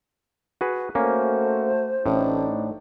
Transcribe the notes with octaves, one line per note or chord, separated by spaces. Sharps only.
F#4 G#4 B4
A3 A#3 C#4 F#4 A4 C5
A1 A2 A3 D4 D#4